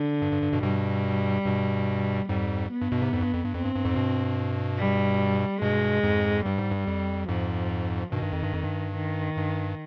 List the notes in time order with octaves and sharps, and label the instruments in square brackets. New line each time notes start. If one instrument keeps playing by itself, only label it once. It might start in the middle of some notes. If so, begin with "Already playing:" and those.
Already playing: [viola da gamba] D3
[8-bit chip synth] G2
G2
G2
G2 B2
[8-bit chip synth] G2 B2 [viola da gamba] G3
[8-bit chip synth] G2 B2
[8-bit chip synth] F2 G#2 [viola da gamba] G3
[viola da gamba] B3
[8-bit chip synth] G2
G2 B2
G#2 C3
F2 G#2
G2
F2
G2
[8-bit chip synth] F2 [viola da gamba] C4
[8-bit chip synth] G2
G2
F2 G#2
G2 B2
[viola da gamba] G3
[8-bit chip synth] G2 B2 [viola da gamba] G#3
[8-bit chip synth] F2 G#2
[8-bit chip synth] G2 [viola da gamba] G3
[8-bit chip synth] G#2
G2
F2
[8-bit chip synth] F2 G#2 [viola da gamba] F3
[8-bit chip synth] G2 B2 [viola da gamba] D#3
[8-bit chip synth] G2
F2
G2
F2
G2
[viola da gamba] D#3
[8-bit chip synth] G2